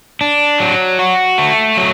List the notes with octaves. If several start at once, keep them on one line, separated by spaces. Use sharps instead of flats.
D4
F#3
F#4
A3
F#3